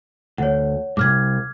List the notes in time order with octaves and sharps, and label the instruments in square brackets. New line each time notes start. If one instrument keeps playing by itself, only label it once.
[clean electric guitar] D2 [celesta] C#5 F#5
[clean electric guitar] C2 G#2 [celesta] D6 F6 G#6